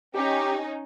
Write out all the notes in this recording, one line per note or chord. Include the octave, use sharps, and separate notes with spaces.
C#4 D#4 G4